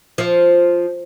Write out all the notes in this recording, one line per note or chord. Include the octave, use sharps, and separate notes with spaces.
F3